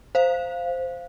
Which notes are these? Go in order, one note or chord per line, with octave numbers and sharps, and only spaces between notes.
C5 F5